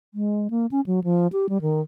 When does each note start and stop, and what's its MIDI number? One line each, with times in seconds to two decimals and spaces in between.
0.14 0.48 56
0.50 0.66 58
0.71 0.81 61
0.86 1.00 54
1.04 1.27 53
1.33 1.46 67
1.49 1.61 55
1.61 1.81 51